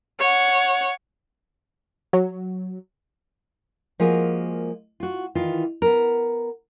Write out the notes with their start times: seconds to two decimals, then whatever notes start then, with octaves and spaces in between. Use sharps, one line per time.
0.19 C#5 F#5
2.13 F#3
4.00 F3 G#3 A#3 F4 F#4 A#4
5.00 F4 F#4
5.35 D#3 E3 F4
5.82 B3 A#4